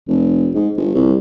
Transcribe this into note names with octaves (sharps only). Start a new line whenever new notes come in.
F1
G#2
G1
C2